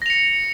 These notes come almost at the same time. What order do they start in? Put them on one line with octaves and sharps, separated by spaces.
A#6 F7 C#7